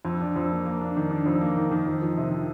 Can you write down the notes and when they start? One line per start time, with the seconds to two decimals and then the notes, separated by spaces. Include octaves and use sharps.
0.05 F2
0.20 D4
0.36 F2
0.51 A#3
0.65 A#3
0.81 D4
0.96 D#3
1.11 D4
1.26 F2
1.41 A#3
1.56 D#3
1.71 D#3
1.86 F2
2.02 F3
2.18 C3
2.31 F3